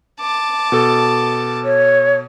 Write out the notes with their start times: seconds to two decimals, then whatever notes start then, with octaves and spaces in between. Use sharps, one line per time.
0.20 A5 D6
0.72 B2 A4
1.65 C#5